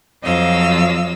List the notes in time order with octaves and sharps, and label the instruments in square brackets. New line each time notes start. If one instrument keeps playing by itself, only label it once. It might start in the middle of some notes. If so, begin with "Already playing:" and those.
[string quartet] F2 F3 F#3 D#5 F5 E6